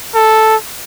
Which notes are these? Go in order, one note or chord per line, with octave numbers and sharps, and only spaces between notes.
A4